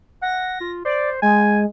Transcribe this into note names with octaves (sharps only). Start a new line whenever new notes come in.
F#5 A#6
F4
C5 D5
G#3 G#5